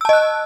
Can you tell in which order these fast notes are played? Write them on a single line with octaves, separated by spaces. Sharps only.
E6 A5 D#5 F#6